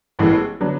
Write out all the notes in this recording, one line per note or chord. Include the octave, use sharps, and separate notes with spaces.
A1 A2 E3 G#3 B3
D3 F#3 B3 D4